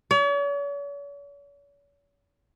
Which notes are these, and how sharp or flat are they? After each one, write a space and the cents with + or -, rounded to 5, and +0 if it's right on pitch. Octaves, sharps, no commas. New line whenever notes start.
C#5 +45